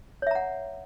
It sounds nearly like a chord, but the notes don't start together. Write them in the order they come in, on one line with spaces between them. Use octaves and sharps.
C#5 E5 A#5 F#5